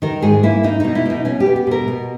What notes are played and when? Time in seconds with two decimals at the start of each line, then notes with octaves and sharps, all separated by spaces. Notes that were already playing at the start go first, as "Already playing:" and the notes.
0.02 D#3 A#4
0.22 G#2 G#4
0.43 A#3 E4
0.63 A#3 D#4
0.80 B2 D#4
0.95 E4
1.06 B2 D#4
1.25 B2 C#4
1.40 G4
1.46 B3
1.56 G4
1.67 B2 A#4
1.88 B2